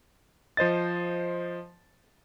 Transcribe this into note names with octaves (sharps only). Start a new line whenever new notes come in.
F3 C5 D#5 A6